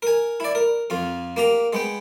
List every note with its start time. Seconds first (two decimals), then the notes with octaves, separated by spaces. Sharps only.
0.02 A#4 G#5
0.40 E4 D5
0.55 A#4
0.90 F2 F4
1.36 A#3 G4 A#5
1.73 G#3 B3 G5